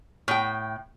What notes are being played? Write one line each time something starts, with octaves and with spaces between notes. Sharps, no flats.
A2 G5